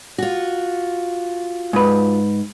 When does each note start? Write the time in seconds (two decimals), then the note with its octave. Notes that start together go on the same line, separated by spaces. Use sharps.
0.18 F4 F#4
1.73 G#2 B4